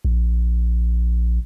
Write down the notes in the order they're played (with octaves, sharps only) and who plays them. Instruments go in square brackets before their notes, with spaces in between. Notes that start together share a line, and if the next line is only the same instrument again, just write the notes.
[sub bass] A#1